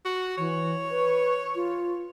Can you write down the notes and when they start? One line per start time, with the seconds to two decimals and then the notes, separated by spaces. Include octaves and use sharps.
0.05 F#4
0.38 E3 C#5
0.91 B4
1.55 F4